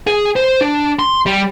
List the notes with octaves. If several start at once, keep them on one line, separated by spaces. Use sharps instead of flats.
G#4
C5
D4
C6
G3